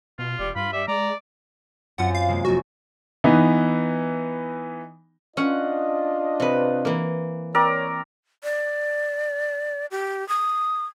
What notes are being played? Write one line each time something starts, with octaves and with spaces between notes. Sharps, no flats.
B2 F4
E1 G3
G2 F4 B5
G3 E5
G#3 D5 A#5
F#2 C4 F4 F#5
F5
C3 G#3 A#3
F1 A#3 F#4
E3 B3 D#4
C#4 D4 F4 D#5 F#5
C3 B4
E3 A#3
C4 A#4 C#5 D5
D5
G4
D#6